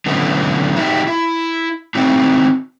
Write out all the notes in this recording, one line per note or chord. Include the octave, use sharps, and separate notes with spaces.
D3 F#3 B3 C#4 E4
D#4 F#4 G4 E5
E4
C4 D#4 E4 F#4